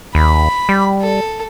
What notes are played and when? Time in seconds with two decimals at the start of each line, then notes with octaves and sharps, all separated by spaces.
0.15 D#2 B5
0.69 G3
1.01 A4